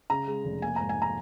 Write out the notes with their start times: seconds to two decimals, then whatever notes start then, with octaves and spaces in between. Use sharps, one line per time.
0.10 C#3 A#5
0.28 G#3
0.45 F1
0.62 A#3 G#5
0.76 G#2 A#5
0.89 G#5
1.02 A#5